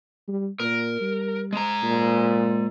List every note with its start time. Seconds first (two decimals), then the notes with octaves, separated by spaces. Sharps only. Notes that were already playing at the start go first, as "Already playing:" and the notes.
0.28 G3
0.60 A#2 A#4
1.01 G3
1.53 G#3 A#5
1.83 A#2